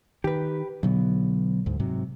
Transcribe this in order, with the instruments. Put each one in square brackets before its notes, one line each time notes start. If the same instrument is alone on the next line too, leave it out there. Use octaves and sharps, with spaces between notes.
[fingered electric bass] D#3 [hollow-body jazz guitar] G4 B4
[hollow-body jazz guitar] B1 [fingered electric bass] D3 F#3 B3
[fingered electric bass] D2 G#2
G#2 C3 F#3